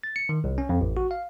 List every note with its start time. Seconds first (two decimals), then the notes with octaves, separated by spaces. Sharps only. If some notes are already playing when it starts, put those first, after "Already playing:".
0.03 A6
0.16 C#7
0.29 D#3
0.44 C2
0.58 C#4
0.69 F2
0.81 A1
0.97 F#4
1.11 F5